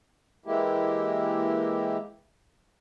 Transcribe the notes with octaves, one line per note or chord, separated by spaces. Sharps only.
E3 G#3 A#3 E4 G4